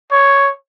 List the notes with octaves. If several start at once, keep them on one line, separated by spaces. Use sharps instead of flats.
C#5